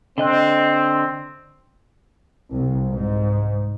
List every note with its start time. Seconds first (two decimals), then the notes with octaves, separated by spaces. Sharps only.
0.18 D3 C4 D#5 F#6
2.53 C2
2.91 G#2